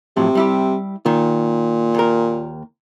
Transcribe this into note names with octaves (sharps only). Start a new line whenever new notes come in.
A2 C3 F3 F#3
G3 E4 G4
A#2 D#3
D#2 A#4